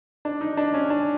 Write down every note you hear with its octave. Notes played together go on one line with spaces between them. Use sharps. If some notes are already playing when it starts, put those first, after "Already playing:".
D4
D#4
D4
C#4
D4